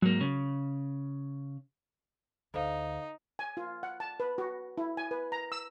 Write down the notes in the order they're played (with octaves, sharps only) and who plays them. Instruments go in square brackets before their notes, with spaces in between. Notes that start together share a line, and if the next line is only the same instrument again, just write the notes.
[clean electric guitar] G#2 A#3 [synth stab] F#3
[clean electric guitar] C#3
[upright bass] D2 [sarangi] D#4 [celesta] A4 C5 F5
[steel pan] G#5
F4
F#5
A5
B4
F#4
E4
G#5
B4
A#5
E6